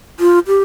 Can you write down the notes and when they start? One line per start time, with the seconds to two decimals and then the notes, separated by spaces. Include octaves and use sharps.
0.20 F4
0.47 G4